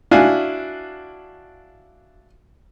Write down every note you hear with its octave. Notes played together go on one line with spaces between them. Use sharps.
D4 E4 F#4 F5 G#5